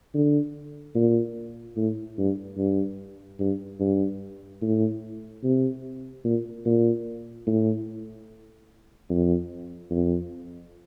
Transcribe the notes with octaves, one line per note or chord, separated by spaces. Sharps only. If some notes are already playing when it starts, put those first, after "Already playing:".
D3
A#2
A2
G2
G2
G2
G2
A2
C3
A#2
A#2
A2
F2
F2